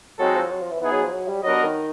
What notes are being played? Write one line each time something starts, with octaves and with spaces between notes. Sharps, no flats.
F#3 G#3 C4 D#4 F#4 A4
F3
F#3
F3
E3
E3 B3 D#4 G#4
F#3
F3
F#3
G3
F#3 B3 D4 F#4 A#4 D#5
D#3